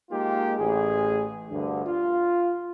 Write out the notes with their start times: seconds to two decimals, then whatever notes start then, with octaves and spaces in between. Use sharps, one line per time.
0.11 G#3 A#3 D#4 F4 G4
0.58 A1 G#4
1.50 D2 G2 D3
1.85 F4